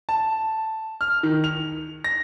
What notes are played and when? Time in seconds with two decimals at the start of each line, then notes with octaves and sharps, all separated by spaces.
0.09 A5
1.01 F6
1.23 D#3
1.44 F7
2.04 A#6